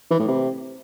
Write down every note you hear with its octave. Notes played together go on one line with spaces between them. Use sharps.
E3
A2
C3